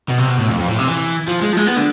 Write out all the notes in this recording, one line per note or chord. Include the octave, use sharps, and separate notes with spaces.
B2
C3
B2
A2
F2
F2
A2
C3
E3
F3
G#3
F3
G#3
B3
D3